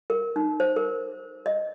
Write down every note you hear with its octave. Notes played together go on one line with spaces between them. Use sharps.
A#4
D#4
C5
A#4
D#5